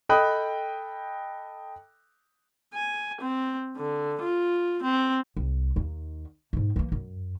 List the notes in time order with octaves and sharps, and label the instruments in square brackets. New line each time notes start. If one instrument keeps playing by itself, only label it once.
[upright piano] A4 D#5 G5 B5 D#6 F#6
[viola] G#5
C4
D3
F4
C4
[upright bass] C2
D#2 D#3
G#2 A3
E3 A#3
F#2